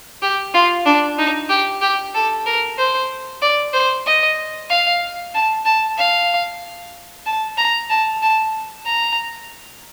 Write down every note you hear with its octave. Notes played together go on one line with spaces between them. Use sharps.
G4
F4
D4
D#4
G4
G4
A4
A#4
C5
D5
C5
D#5
F5
A5
A5
F5
A5
A#5
A5
A5
A#5